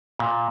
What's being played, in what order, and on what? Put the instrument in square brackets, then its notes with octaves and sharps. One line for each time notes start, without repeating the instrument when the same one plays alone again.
[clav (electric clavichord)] A#2